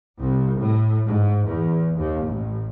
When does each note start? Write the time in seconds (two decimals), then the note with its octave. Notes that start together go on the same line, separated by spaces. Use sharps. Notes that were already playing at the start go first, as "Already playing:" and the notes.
0.20 C2
0.60 A2
1.07 G#2
1.47 E2
1.97 D#2
2.27 A1